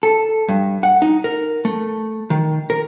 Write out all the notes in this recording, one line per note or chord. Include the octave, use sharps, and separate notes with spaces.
A4
G2
F#5
D#4
A#4
A3
D#3
A#4